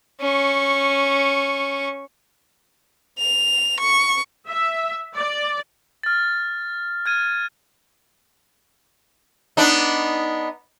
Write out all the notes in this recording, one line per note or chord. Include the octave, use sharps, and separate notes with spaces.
C#4 C#6
F7
C#6
E5
D5
F6 A6
F6 G#6 D#7
B3 D4 D#4